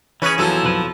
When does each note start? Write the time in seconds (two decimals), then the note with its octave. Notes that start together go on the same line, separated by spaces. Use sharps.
0.22 E3 C#4 G#4 B4
0.38 E2 F3 F#3 A4 E6
0.63 B1 F2 B4